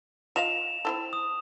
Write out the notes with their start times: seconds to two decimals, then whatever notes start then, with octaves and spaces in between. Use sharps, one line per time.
0.36 F4 D#5 F5 E7 F7
0.85 C4 E4 A4
1.13 D#6